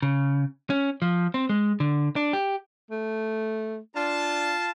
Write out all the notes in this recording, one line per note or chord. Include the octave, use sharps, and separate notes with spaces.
C#3
C#4
F3
C4
G#3
D3
D4
G4
A3
D4 F4 A5